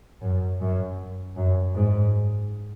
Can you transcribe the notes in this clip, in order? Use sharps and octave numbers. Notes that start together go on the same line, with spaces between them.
F#2
F#2
F#2
G#2